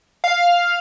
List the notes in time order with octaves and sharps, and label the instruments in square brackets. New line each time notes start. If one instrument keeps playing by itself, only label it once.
[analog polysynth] F5